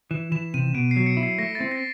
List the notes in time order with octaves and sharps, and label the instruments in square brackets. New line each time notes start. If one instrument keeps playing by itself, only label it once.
[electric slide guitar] E3 [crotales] E7
[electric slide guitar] E3 [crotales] E7
[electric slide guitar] C3 [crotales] D#7
[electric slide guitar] B2 [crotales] D7
[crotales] C7
[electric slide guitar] F#3
[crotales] C#7
[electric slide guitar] E4
[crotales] C7
[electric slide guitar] A3 [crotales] A#6
[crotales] A6
[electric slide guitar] C4
[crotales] A#6